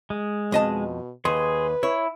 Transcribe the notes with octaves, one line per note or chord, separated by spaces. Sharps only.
G#3
F2 B2 D#5 A5
D#2 G#4 B4 C6
E4 C#5